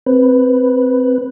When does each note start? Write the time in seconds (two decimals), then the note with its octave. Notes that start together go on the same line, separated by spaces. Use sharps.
0.06 C4 B4